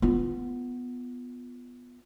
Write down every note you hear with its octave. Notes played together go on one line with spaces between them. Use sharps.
B3 F4